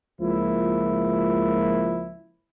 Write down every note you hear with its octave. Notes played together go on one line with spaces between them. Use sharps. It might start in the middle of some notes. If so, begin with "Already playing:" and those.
C#2 F3 A#3 E4